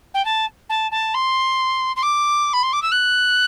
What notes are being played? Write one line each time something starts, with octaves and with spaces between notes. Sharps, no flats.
G5
A5
A5
A5
C6
C6
D6
B5
C6
D6
E6
F#6